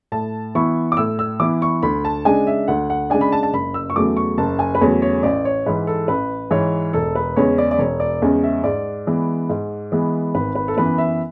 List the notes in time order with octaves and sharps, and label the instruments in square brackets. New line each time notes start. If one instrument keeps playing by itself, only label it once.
[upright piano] A2 A5
E3 B3 E4 C#6
D6
A2 E6
E6
E3 B3 E4 D6
C#6
D2 B5
A5
C#3 G#3 D4 G#5
E5
D2 F#5
F#5
C#3 G#3 D4 G#5
B5
A5
A5
F#1 B5
E6
C#6
E2 C#3 F#3 A3 D6
C#6
F#1 A5
G#5
B4
E2 C#3 F#3 A3 C#5
C#5
A1 D5
C#5
G#2 E3 B4
A4
A1 B4
G#2 E3 C#5
E1 A4
B4
E2 C#3 G#3 C#4 C#5
D5
D5
E1 C#5
D5
E2 C#3 G#3 C#4
E5
G#2 D5
E3 G#3 B3
G#2
E3 G#3 B3
G#1 B4
B4
A4
F#2 E3 B3 B4
E5